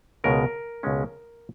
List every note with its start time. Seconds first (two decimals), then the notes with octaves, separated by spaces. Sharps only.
0.24 C#2 B2 G#3 C#4 A#4
0.83 C#2 B2 G#3 C#4